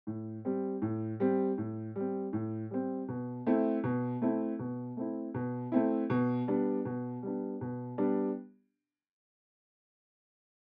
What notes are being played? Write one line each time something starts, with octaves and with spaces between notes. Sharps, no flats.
A2
G3 C4
A2
G3 C4
A2
G3 C4
A2
G3 C4
B2
A3 C4 E4
B2
A3 C4 E4
B2
A3 C4 E4
B2
A3 C4 E4
B2
G3 B3 D4
B2
G3 B3 D4
B2
G3 B3 D4